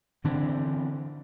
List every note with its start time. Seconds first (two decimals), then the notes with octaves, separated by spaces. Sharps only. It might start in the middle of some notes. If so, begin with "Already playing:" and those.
0.24 D3 E3 C4 D4